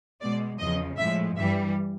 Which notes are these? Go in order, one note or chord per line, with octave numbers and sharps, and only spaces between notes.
B2 G#3 D5
E2 C#3 F3 D#5
A2 F3 G#3 E5
G2 E3 G3 E5